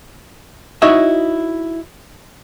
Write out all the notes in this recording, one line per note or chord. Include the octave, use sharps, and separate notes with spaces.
D#4 E4 F#4 C#5 D#5 E5